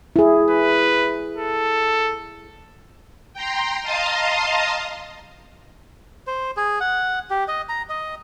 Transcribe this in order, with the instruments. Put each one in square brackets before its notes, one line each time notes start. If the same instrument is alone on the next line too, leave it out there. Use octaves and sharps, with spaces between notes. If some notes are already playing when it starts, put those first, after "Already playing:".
[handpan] E4 G#4
[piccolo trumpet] B4
A4
[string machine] G5 A#5 C6
D#5 F5 A5 A#5 C6 D#6
[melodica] C5
G#4
F#5
G4
D#5
A#5
D#5